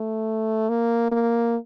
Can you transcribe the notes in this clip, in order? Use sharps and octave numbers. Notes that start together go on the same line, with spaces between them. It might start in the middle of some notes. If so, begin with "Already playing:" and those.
Already playing: A3
A#3
A#3